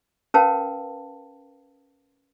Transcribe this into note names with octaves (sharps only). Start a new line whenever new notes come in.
C#4 A#4 B4 F5 G5 A5